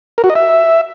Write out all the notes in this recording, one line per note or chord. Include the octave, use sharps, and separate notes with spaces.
A#4
F#4
D#5
E5